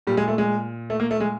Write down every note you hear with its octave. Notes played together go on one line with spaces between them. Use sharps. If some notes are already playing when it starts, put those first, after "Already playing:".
A#2 G3
G#3
A3
G#3
A3
A#3
A3
G#3